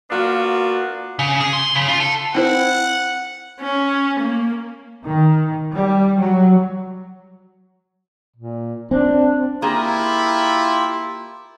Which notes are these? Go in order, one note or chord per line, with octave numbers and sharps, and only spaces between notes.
A#3 B3 D4 F4 F#4
C#3
G#4
C6
C#3
F4
A4
C4 E4 C5 F#5
C#4
A#3
D#3
G3
F#3
A#2
C4 D4
A#3 E4 F4 G4 G#4 A#4